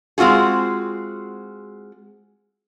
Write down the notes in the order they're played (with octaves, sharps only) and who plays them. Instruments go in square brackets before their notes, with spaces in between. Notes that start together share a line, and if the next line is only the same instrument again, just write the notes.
[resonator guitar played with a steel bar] G#3 C4 F4 F#4 G#4